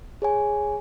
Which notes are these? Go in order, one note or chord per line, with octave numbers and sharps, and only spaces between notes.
G#4 C#5 G#5